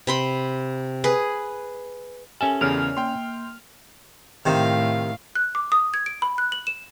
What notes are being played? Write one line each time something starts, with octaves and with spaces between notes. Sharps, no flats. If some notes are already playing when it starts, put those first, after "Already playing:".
C3 B5 C6
G#4 B4
C#4 G4 A4 A#4 E5 G#5 A5
E2 C#3 A#4 C#5 D5 F6 F7
A#3 G5 C6
A2 C3 D#3 F5
F#6
D6
D#6
G#6
D7
B5
F#6
F#7
E7